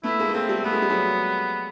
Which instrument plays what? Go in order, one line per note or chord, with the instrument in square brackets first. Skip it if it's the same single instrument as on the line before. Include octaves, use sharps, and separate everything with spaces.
[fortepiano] A3 B3 [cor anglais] E4
[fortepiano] G#3 A#3
A3
[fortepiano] G#3 A#3 [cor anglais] C4
[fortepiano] G3 A3
[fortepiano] A3 [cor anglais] B3
[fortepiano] G#3
G3
F#3 G#3